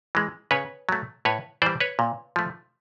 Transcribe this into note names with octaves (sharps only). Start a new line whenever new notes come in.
E3 G#3
C#3 B4 C#5
F#3 A3
A2 B4 C#5
E3 G3 C5 D5
B4 C#5
A#2
F3 A3